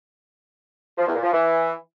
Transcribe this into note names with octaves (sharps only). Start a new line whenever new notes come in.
F3
E2
A#2
F3
E3